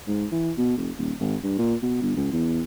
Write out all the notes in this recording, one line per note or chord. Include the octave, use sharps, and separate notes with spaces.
G#2
E3
B2
F1
D#1
G#1
G2
A#2
B2
G1
C#2
E2